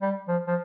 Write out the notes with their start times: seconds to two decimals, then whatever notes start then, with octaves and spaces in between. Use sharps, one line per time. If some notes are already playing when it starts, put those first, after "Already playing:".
0.02 G3
0.28 F3
0.47 F3